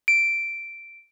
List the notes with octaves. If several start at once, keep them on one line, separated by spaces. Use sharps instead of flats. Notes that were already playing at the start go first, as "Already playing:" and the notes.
D7